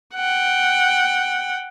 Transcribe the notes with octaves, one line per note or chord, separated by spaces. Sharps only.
F#5 G5